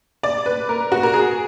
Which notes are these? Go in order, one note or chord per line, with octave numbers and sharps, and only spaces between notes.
D5
B4
A#4
F#4
A#4
G#4